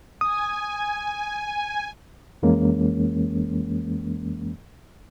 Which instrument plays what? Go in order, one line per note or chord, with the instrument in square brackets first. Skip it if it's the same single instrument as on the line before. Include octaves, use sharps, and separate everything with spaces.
[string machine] G#5 [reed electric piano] D#6
[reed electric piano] F2 E3 G#3 A#3 C#4